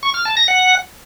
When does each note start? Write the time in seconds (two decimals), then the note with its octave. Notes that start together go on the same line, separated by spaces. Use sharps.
0.03 C#6
0.14 F6
0.25 A5
0.37 A#6
0.48 F#5